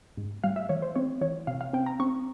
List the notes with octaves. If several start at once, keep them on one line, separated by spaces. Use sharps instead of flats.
G#2
G3 F5
E5
E3 C#5
C5
C4 C#5
E3 C#5
C3 F5
F5
C4 G5
A#5
C4 C#6